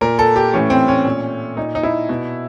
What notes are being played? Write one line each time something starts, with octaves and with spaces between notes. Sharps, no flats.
A#2 A#4
A4
G4
A2 E3 C#4
C4
C#4
A#2
A#2 D#4
D#4
E4
B2